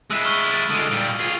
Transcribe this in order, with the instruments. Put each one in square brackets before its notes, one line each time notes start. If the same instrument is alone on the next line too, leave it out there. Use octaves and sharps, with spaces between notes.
[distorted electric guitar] G#3 E4 [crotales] E6 F#6 D#7
[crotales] C#6 F6 G7
A6 D7
[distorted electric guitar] D3 G#3 [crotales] D#6 A6 D7
[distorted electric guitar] A#2 G3
F4 G#4